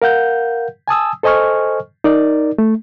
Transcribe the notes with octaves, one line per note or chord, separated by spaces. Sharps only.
A#4 F5 F#5 G6
G#5 A5 D#6 E6
A4 C5 D#5 G#5 C#6 F6
D#4 A#4 D5
A3